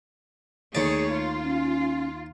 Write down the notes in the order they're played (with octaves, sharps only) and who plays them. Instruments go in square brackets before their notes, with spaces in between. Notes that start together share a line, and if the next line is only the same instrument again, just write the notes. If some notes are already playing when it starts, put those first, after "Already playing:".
[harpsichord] D#2 D5 [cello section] A3 G#4 C#5
[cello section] F4
[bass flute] C#4